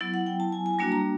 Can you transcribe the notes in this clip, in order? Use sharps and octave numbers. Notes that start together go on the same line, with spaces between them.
F#3 B3 E4
F#5
G5
A5
G#5
G#5
G3 A#3 D4 F#4 A5
A#5